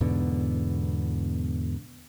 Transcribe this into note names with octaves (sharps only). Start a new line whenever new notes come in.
E2 G#2 B2 D3